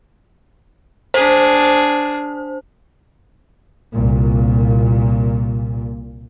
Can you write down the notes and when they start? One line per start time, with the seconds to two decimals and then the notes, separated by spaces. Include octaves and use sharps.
1.14 D4 G#4 C5
3.94 C2 A#2